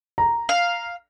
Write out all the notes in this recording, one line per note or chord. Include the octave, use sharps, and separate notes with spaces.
A#5
F5